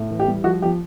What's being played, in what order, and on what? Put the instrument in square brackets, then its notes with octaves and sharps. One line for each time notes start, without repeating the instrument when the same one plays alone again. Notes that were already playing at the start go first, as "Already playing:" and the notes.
Already playing: [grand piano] A2
E3
G4
G3
F3 F#4
F3 G4